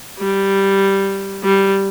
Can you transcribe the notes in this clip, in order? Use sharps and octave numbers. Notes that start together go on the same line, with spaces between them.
G3
G3